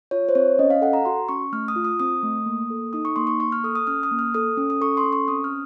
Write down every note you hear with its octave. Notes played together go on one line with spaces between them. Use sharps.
F4 C#5
C5
C4 C#5
C#4 D#5
F5
A4 F#5
A#5
F#4 C6
C#4 C#6
A3 F6
D#6
F4
D#6
C4 D#6
A3
A#3
A4
D#4 D#6
C#6
A#3 C6
C#6
A#3 C#6
F6
A4 D#6
D#6
C#4 F6
D#6
A#3
F6
A4 D#6
C#4
D#6
A4 C#6
C6
C#4
C#6
C4 D#6
F6